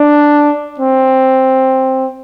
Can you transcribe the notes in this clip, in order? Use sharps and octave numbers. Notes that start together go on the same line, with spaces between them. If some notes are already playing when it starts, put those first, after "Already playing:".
Already playing: D4
C4